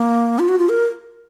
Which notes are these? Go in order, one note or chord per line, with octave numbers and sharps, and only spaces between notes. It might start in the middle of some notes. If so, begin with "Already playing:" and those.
Already playing: A#3
F4
F#4
F4
A#4